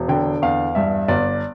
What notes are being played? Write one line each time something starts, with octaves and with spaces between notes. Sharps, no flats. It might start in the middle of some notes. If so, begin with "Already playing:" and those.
Already playing: E1
D3 G5
E2 F5
G2 E5
G1 D5